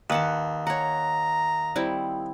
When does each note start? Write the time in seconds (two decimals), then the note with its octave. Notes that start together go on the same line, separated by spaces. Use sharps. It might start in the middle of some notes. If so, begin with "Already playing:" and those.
0.10 D#2 B4 F#5 A5
0.67 C#5 F#5 A#5
1.76 G3 C4 E4